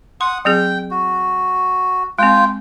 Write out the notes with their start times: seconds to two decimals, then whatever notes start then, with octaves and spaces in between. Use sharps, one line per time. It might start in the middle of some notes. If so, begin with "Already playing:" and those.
0.21 F#5 C6 D#6
0.45 F#3 C4 G#4 G5
0.91 F#4
2.19 G#3 C4 F4 G5